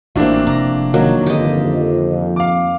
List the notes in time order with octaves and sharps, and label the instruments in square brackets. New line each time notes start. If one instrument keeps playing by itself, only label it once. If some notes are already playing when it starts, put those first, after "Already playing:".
[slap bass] A1 [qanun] A#3 F#4 [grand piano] C4 D4 E4
[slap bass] F1 [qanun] A#5
[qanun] D#3 F#3 A#3
[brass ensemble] G1 F2 [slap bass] D3 [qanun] G4 D#5
[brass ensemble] F2
[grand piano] F5 D6